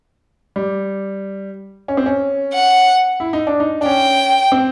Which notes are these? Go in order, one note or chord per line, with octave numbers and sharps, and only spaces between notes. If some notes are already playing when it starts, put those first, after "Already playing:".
G3
C#4
C4
C#4
F#5
E4
D#4
D4
D#4
D4
C#4 G5
C4